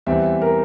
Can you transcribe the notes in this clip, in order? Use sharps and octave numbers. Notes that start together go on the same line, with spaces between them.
E2 E3 G3 C4 E5
A#4